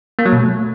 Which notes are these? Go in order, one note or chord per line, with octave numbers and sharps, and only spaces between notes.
A#3
F#3
B2
A3